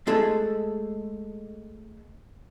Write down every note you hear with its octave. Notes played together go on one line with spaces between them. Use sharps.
G#3 A3 G#4 A4